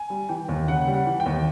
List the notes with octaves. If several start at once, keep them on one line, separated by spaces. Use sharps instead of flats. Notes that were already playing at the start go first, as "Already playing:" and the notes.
Already playing: G#5
G3
E3 G5
D#2
C#3 F#5
G3
F#5
E3
G5
D#2